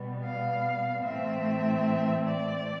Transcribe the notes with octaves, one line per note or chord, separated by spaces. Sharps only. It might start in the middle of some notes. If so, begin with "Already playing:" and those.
Already playing: B2 G3 B3
F5
A2 E3 A3 C4 E5
D5